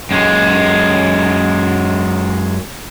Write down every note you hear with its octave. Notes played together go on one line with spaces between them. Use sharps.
F#2 G#3